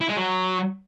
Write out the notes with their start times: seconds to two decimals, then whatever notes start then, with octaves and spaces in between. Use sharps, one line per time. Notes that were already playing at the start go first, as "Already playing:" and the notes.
0.01 E4
0.09 G#3
0.17 F#3